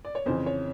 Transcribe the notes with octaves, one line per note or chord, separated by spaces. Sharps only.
D5
C#5
F2 C#3 E3 C5
C#5